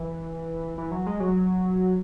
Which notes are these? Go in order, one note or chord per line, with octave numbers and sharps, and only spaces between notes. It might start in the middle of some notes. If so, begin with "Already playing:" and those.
Already playing: E3
E3
F#3
G#3
F#3